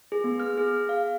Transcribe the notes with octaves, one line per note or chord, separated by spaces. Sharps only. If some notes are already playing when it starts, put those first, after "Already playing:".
G#4
B3
F6
G#4
F5